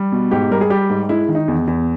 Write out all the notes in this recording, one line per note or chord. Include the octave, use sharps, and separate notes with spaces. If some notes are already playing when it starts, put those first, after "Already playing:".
Already playing: G3
B2
G#2 G4
G3 A#4
G#4
G3 G4
G#2
G#3 E4
D#3
D#4
E2
E2